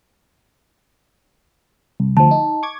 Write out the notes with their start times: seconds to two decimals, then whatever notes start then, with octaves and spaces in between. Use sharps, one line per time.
2.00 C2
2.17 D2 F3 A5
2.31 D#4
2.63 C#6 D6 G#6